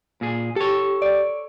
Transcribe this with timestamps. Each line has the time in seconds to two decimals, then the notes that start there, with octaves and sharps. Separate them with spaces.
0.21 A#2 G#4
0.56 G4 A4 C#5
1.02 D5